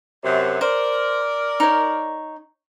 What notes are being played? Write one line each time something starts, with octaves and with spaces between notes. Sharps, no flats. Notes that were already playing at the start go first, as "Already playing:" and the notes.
F#2 C3
A#4 C5 D5
D#4 C#5